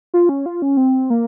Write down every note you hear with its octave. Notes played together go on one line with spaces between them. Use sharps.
F4
C#4
F4
C#4
C4
A#3